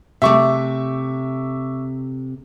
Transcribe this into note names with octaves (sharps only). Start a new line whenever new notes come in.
C3 A3 E5 C#6 D6